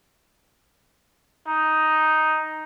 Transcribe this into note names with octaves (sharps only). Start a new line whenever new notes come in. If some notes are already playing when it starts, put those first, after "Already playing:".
D#4